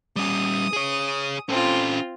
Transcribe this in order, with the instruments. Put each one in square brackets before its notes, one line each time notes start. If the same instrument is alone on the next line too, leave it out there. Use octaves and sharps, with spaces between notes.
[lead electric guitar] G3 C#4 [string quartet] D#6
[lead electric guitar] G#4 C#5
[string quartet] C4 F4 [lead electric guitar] C#4 A4